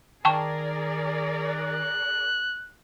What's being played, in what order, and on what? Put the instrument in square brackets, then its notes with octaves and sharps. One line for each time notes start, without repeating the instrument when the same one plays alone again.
[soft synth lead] D#3 [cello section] G#4 A#4 D5 [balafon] G5 A5 C#6
[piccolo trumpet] F#6